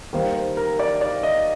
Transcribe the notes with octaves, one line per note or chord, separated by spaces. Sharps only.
D#3 G3 A#3 C5
C5
A#4
D5
D5
D#5